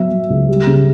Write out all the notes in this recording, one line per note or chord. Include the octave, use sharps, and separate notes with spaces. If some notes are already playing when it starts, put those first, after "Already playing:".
Already playing: F#3 B3 E5
F#3
C#2
G3
C#3